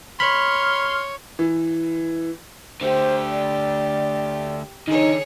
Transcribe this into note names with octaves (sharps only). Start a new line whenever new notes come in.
C#5 B5 C6 F6
E3
D3 A3 G4 C5
D5
D3 D#3 D#4 G#4 C#5